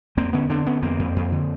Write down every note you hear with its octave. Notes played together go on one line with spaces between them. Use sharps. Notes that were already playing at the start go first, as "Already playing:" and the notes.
F2 A#3 C4
D3 B3 C#4
D3 C4 D4
D3 B3 C#4
F2 A#3 C4
F2
F2
D3